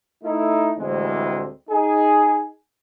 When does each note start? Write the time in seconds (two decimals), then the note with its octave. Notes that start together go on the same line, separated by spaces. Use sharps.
0.24 A3 D#4 E4 A4
0.79 D2 A2 E3 G3 G#3 C4
1.70 D#4 G#4 G#5